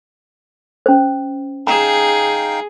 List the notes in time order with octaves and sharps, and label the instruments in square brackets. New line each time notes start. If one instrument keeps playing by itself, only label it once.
[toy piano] C#4 C5
[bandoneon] D#4 F5 G5 [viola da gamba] G#4 [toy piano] A#5